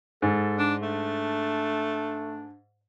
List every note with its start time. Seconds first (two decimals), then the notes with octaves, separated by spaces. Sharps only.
0.22 G#2 A4
0.59 D4
0.82 A3 D4